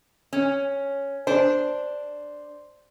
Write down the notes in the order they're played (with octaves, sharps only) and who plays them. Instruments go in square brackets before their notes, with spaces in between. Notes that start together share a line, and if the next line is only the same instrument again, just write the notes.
[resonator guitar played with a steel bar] C#4
[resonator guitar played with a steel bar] D4 [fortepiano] C5